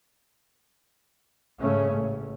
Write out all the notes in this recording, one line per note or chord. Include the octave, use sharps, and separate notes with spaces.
G#2 C#3 G#3 A3 C#4
A1